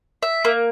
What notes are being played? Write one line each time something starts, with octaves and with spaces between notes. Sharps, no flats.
E5
A#3